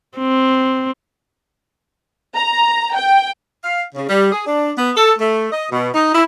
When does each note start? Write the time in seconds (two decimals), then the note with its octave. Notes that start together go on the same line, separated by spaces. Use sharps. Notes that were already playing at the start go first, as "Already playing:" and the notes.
0.17 C4
2.36 A#5
2.95 G5
3.63 F5
3.95 C#3
4.09 G3
4.32 G#4
4.46 D4
4.77 B3
4.96 A4
5.19 A3
5.51 D#5
5.70 B2
5.93 D#4
6.13 E4